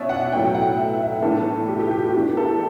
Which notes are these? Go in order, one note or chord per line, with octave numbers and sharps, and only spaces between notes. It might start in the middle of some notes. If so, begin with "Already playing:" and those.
Already playing: B2 C#4 C#5 D5 E5
F#5
A2 F#3 B3 G5
F#5
E5
E5
A2 E3 B3 D4 A4
G4
G4
G4
F#4
E3 B3 D4 G4
A4